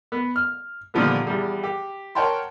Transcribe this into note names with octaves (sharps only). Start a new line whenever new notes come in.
B3
F6
A#2 D3 D#3 F3 G3 B3
E2 G3
G4
A#4 C#5 F#5 G5 A5 C6